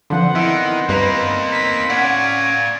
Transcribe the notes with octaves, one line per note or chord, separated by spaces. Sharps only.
D3 F3 B3 C4 F#5
D#3 E4
G2 A#3 D#4 B4 B5
B6
C#4 D5 F5 F#5 G#6